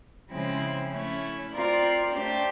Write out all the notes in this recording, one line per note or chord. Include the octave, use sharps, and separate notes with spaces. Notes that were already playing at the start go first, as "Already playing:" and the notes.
C#3 F3 G#3 C4 E4
A3 C#4 E4
C4 F4 A#4 D5
A3 D4 G4 C5